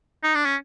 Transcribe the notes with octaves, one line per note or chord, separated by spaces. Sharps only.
D#4
D4
C#4